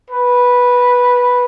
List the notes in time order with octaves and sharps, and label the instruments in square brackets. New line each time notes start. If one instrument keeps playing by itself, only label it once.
[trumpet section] B4